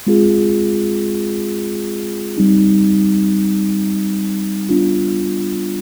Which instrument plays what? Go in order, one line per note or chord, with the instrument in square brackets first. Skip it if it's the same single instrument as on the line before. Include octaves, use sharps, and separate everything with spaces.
[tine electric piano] G#3 C4 F4 G#4
G3 C4 D#4
G3 B3 D4 F4